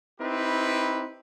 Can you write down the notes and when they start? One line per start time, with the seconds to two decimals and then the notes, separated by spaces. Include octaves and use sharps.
0.20 C4 D#4 E4 G4 B4